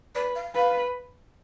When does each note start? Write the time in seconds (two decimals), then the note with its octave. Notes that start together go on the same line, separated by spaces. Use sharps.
0.15 B4 D5
0.36 F5
0.55 B4 F5